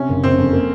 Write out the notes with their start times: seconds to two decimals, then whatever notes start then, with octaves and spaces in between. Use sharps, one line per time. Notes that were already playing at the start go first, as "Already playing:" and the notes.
Already playing: C3 C#4
0.09 F#1
0.24 F#1 C4
0.38 F2
0.53 A#3